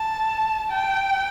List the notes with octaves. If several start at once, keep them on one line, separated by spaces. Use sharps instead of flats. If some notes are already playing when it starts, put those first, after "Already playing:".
Already playing: A5
G5